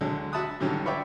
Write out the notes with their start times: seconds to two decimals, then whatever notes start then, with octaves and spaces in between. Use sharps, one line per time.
0.01 D2 D3 F#3 G#3
0.32 F#4 E5 A5 B5 D#6 F#6
0.60 G#2 D3 F#3 G3 C#4
0.85 F4 B4 C#5 D5 E5 G5